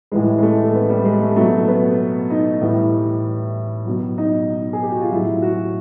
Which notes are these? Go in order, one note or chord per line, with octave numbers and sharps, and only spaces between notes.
A2 E3 G3 G#3
G#3
A3
B3
G3
G#3
A3
B2 F#3 A3
B3
D#4
A2 E3 G3
B2 F#3
D#4
G#4
G4
F#4
F4
A2 F#3 E4
F#4